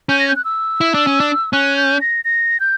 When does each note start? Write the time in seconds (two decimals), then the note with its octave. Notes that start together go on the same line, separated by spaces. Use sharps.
0.09 C#4 G6
0.19 A#6
0.28 G6
0.36 F#6
0.45 E6
0.81 E4
0.94 D4
1.07 C#4
1.20 D4
1.53 C#4 F#6
1.77 G6
2.01 A#6
2.25 A#6
2.60 G6